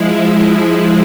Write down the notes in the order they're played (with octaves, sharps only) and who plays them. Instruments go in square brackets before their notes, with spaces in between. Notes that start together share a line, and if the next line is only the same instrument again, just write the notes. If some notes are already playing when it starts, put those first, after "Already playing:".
Already playing: [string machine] F3 G#3 E4